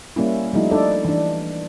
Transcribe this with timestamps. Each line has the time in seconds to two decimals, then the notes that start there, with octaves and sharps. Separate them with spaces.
0.16 G3 A#3 C#4 E4
0.53 F3 G3 A3 D#4 E4
0.71 D4 D#4 A4 D5
1.05 E3 D4